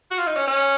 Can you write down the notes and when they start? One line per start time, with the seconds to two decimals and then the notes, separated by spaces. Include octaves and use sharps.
0.11 F#4
0.18 F4
0.26 D#4
0.37 C#4
0.47 C#4